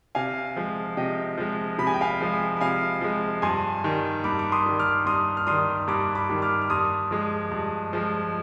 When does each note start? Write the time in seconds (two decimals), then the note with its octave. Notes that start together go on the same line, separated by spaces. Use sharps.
0.15 C3 F5 G#5
0.56 F3 G#3
0.97 C3 D#5 G5
1.38 F3 G#3
1.78 C3 B5
1.87 G#5
1.94 G5
2.01 F5 G#5
2.21 F3 G#3
2.57 B5
2.61 C3 F5 G#5
3.01 F3 G#3
3.42 G2 G#5 C6
3.84 D#3 G3
4.24 G2 B5 D6
4.39 D6
4.52 C6 D#6
4.66 D#3 G3
4.79 D6 F6
5.06 G2 C6 D#6
5.37 F6
5.47 D#3 G3 C6 D#6
5.88 G2 B5 D6
6.15 B5 D6
6.30 D#3 G3
6.42 D6 F6
6.62 F6
6.70 G2 C6 D#6
7.11 F3 G#3
7.51 G2
7.93 F3 G#3